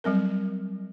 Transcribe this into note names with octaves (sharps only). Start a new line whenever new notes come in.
F#3 G3 C4 A#4